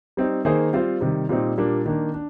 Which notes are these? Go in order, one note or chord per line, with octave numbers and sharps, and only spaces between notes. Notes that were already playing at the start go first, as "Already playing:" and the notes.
G3 C4 D#4
D#3 A#3 D#4 G#4 C5
G3 C4 F4 C5
C3 D#3 G3
A#2 G3 C4 D#4
A#2 G3 A#3 D4
D#3 A#3 D4
D4